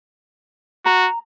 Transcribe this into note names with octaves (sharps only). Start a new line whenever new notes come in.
F#4 A#5